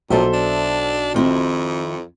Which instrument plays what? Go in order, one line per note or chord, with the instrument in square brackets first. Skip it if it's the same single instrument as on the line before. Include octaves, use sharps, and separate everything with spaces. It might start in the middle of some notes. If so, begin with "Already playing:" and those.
[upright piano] B1 [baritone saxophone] A#2 [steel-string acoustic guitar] A4 C5 E5
[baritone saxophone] D4
[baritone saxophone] F2 [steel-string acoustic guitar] D#3 C4 E4